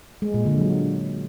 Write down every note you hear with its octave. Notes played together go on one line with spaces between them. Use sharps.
G#3
A#2
D3
F#3